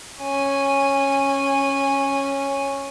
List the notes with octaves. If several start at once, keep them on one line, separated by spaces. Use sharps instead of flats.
C#4 G#5